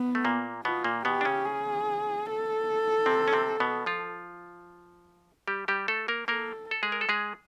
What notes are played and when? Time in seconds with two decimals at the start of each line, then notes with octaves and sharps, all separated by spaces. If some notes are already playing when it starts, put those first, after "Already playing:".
Already playing: B3
0.15 A3
0.25 A#2 A#3
0.64 B2 B3 F4
0.84 A#2 A#3
1.05 B2 B3 G4
1.21 D4
1.25 C#3 C#4
1.45 G#4
2.26 A4
3.06 C3 C4
3.28 C#4
3.33 C3 C4
3.60 B2 B3
3.86 F3 F4
5.48 G3 G4
5.68 G3 G4
5.88 A3 A4
6.08 A#3 A#4
6.28 A#3 A4 A#4
6.71 A4
6.83 G#3 G#4
6.92 A#4
7.01 A4
7.09 G#3 G#4